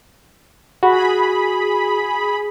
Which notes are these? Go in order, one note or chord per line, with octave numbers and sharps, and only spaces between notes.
F#4 G#4 B5